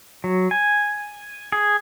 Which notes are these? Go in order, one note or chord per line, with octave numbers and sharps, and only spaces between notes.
F#3
G#5
G#4